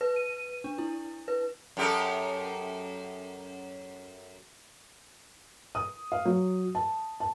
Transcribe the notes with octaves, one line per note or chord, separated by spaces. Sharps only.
B4
D#7
D4
E4
B4
F#2 G4 A4
D#6
F5
F#3
A5
A5